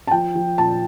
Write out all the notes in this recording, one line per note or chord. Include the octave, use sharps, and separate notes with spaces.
A5
F3 G5
F3
A#2 A5